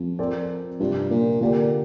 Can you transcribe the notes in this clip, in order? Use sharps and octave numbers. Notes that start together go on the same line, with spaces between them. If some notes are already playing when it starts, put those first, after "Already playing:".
Already playing: F2
F3 C4 A#4 D5
G2 C3 F3 D4 F4
A#2
A#2 D3 A#3 D4 G4 D5